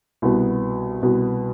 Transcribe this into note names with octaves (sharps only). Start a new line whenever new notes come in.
C2 B2 B3
C2 B2 B3